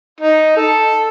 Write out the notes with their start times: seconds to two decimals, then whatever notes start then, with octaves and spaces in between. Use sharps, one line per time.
0.20 D#4
0.56 A4